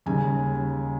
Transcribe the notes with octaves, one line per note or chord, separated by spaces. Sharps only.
D#2 C#3 G3 G#5